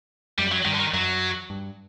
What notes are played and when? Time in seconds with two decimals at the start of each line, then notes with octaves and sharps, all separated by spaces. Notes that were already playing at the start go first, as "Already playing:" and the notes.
0.38 F#2 G3
0.52 F#3
0.65 G2 D#3
0.74 D3
0.79 D#3
0.93 F#2 F#3
1.50 G2